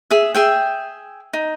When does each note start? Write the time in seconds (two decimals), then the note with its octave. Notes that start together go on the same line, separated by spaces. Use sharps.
0.11 G#4 E5
0.35 G#4 E5 G5
1.33 D#4